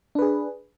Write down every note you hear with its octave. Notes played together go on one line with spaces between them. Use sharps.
D4 G#4 B4